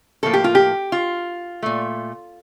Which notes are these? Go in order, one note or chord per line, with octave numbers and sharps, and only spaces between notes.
A2 F3 A#3 A4
G4
F4
G4
F4
A#2 A3